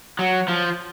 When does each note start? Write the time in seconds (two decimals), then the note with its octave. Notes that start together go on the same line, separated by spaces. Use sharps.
0.19 F#3
0.48 F3